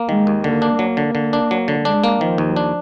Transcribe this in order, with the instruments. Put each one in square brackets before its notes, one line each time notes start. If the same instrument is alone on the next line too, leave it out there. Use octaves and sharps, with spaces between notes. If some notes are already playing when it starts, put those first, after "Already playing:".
Already playing: [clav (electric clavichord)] A#3
[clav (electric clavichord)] D#3 [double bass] G#3
[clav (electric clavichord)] D#2
[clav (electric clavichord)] D3 [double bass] A#3
[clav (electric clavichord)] D4
[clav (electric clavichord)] F#3 [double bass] A#3
[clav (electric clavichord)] D3
D3
D4
F#3
D3
[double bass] G#3 [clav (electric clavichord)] D4
[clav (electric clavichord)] A#3
[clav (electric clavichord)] D#3 [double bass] F3
[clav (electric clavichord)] D#2
D4